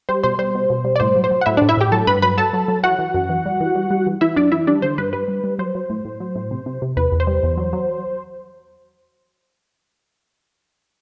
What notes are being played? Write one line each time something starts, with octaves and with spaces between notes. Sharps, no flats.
G3 C5
B2 C5
G3 C5
B2
B2
G3
D5
A2 C5
F#3
C5
F#3
F#5
A2 E4 E5
A2 D4 D5
E4 E5
A2 G4 G5
F#3 A4 A5
G2 B4 B5
F#3 B4 B5
F#3 A4 A5
F#3
F#3
E3 F#4 F#5
E3
F#2
E3
G3
E3
G3
G3
E3
E3 E4 E5
F#2 D4 D5
E3 E4 E5
G3 D4 D5
D3 C5
G2 B4
G3 B4
G3
G3
F#3 C5
F#3
A2
A2
F#3
A2
C3
C3
C3
E2 B4
E2
C5
G3
E2
F#3
F#3